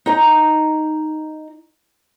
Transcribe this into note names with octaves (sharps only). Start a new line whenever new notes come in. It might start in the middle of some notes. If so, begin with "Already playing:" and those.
D#4 A#5